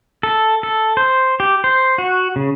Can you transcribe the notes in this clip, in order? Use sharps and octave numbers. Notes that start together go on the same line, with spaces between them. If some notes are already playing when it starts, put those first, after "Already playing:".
A4
A4
C5
G4
C5
F#4
C#3